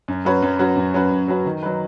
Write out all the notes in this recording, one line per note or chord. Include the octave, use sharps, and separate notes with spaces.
F#2
F#3 C#4 F#4 B4
F#2
F#3 C#4 F#4 B4
F#2
F#3 C#4 F#4 B4
F#2
F#3 C#4 F#4 B4
D#3
F#3 D#4 B4